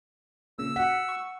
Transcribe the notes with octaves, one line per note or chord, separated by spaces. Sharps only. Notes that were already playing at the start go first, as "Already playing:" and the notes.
A#2 C#3 E6
F#4 F#5 B6
C#6